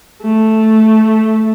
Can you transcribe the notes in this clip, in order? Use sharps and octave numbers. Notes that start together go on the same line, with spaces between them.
A3